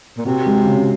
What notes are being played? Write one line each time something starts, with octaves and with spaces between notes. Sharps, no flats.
A#2
C3 F#4
G#3
C#3